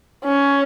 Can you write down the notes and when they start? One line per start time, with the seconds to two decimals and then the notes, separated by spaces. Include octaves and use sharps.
0.24 C#4